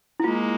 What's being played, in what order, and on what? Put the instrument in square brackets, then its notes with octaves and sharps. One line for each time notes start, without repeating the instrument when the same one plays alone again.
[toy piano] E4
[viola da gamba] G#3 A#3 [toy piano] F4